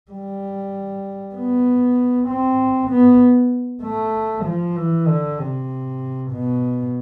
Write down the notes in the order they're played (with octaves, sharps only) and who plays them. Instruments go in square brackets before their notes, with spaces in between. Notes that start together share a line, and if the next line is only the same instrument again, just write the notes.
[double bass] G3
B3
C4
B3
A3
F3
E3
D3
C3
B2